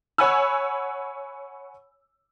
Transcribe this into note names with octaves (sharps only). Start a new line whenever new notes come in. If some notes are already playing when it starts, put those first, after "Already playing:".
C#5 F#5 G#5 B5 E6